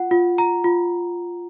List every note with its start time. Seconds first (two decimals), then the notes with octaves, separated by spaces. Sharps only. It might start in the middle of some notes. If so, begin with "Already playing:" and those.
Already playing: F4 F#5
0.11 F4
0.38 A#5
0.64 F4